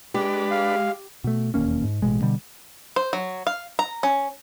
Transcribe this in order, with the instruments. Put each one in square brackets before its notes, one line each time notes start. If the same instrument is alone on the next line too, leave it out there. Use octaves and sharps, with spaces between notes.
[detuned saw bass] G#3 [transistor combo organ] D4 B4 [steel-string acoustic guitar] G4
[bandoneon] F5
[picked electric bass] B2 A3
E1 D#2 A#3 C#4
G#2
A1 B2 G#3
B2 D3 G3
[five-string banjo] C5
F#3
F5
A#5
C#4